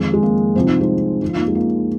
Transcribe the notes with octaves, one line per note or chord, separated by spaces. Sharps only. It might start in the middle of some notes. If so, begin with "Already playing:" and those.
Already playing: F2 D#3 G#3
G#3
A#3
C2 C3 F3 C4
D#4
G#3 C4
F2 F3 D#4 F4
A#3 D#4
G#3
A#3